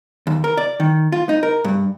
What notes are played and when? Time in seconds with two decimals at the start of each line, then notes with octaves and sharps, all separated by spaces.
0.27 D#2
0.44 A#4
0.57 D5
0.80 D#3
1.12 F4
1.29 D#4
1.43 A#4
1.64 G2